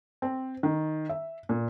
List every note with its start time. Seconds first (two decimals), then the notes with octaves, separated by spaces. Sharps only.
0.22 C4
0.63 D#3
1.09 E5
1.49 A#2